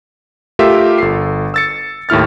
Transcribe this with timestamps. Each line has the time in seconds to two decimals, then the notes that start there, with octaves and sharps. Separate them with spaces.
0.59 A3 F4 G4 A#4 E5
0.98 G1 A4 C7
1.54 E6 A6 C#7
2.09 D#2 A2 E4 F6 A6